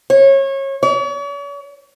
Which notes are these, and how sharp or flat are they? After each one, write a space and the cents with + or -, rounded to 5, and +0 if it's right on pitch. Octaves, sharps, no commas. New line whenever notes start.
C#5 -25
C#5 +45